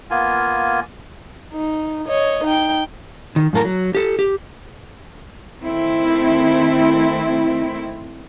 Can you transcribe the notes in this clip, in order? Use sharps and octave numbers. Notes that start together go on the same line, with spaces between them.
A#3 B3 F4 G#5
D#4
C#5 D#5
D#4 G5
D#3
F#2 A2 A4 A#4
F#3
G4 A4
G4
D#3 A3 C4 E4